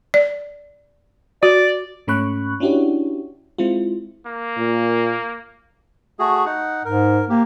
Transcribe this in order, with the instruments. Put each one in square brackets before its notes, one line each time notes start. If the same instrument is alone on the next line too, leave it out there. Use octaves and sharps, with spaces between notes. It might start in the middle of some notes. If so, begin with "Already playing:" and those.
[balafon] D5
[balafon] F#4 [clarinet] D5
[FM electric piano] G#2 A3 C#4 B5 C#6 F#6
C#4 D4 E4 F#4 G4 C#5
G#3 C4 E4 F4
[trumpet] A#3
[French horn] A#2
[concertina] A3 F#4 G#4
D#4 F#5
[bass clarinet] G#2 [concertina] A#4
[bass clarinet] A#3 [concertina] G4